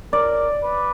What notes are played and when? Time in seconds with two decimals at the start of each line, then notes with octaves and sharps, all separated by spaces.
0.13 A#4 D5
0.63 B4